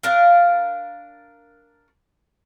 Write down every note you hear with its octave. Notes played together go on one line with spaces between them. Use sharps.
D4 A#4 F5